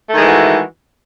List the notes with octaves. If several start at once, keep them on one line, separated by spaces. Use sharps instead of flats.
D#3 E3 G#3 A3 F#4